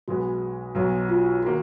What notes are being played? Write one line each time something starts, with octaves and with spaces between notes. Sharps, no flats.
B1 B2 G#3 B3 F#4
B1 B2 F#3 F#4
F4
D#3 A#3 F#4